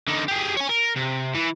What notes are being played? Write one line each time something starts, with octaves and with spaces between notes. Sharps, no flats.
D3 D#4
G4 G#4
C#5 G#5
A#4
C3
E3